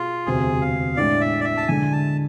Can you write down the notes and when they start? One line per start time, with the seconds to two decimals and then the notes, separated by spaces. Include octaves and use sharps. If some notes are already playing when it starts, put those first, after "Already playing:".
Already playing: B2 F4 G#4
0.26 E1 D2 C3 G#4
0.61 F5
0.97 A2 G#3 D4 D5
1.21 E5
1.41 D5
1.44 E5
1.57 A5
1.68 D3 G#3 D4 G#5
1.92 A5